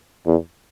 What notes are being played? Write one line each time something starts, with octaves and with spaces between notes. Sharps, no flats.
E2